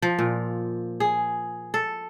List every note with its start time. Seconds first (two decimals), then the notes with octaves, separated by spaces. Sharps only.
0.02 F3
0.19 A#2
1.00 G#4
1.74 A4